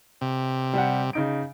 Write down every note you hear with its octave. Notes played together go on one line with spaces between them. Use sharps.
C3
G3 F#5
C#3 D#4 D7